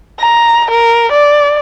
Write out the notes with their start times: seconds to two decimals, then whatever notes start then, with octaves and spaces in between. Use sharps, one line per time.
0.20 A#5
0.71 A#4
1.12 D5